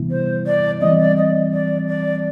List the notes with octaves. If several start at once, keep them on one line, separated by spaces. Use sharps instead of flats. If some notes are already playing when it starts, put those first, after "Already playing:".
Already playing: C3 E3 G3 B3 E4
C5
D5
E3 G3 C4 D#5
D5
D#5
D5
D5